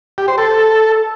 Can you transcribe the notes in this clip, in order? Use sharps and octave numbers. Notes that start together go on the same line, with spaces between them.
G4
C5
A4